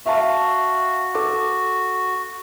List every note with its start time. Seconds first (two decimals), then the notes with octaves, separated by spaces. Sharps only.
0.06 F#4 E5 F5 A5
1.15 A4 D6